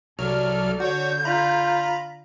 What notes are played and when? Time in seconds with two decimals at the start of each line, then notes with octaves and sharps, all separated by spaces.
0.19 C2 F#3 A4 D5 F6
0.80 D3 F#4 C#5 G6
1.25 F4 A#5 B5